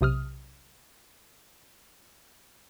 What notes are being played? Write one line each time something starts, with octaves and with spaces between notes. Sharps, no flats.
B1 C3 D#6 F6